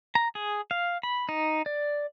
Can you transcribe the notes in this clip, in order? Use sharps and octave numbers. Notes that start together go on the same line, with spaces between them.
A#5
G#4
F5
B5
D#4
D5